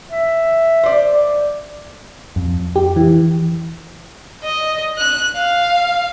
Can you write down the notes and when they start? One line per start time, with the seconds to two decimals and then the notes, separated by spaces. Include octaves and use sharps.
0.10 E5
0.83 C5 D5
2.36 F2
2.76 G4
2.96 E3
4.44 D#5
4.98 F#6
5.36 F5